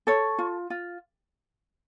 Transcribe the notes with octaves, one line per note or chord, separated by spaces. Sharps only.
A4 C#5
F4
F4